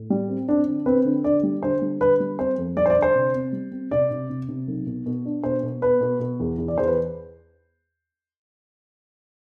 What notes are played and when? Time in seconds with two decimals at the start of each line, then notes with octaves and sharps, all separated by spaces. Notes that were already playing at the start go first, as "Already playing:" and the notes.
Already playing: A2
0.10 G3
0.29 C4
0.48 C4 D4
0.67 D3
0.86 C4 B4
1.05 D3
1.24 D3 D5
1.43 G3
1.63 D3 C5
1.82 G3
2.00 D3 B4
2.20 G3
2.39 C4 C5
2.58 F2
2.76 G3 D5
2.86 C5
2.90 D5
2.96 D3
3.02 C5
3.15 C3
3.35 C4
3.53 G3
3.72 C4
3.91 C3 D5
4.10 C3
4.30 C3
4.49 C3
4.68 B1
4.86 B2
5.06 B2
5.25 D4
5.43 B2 C5
5.63 B2
5.82 B3 B4
6.01 B2
6.20 B2
6.40 E2
6.58 E2
6.68 D5
6.78 E2 C5
6.87 B4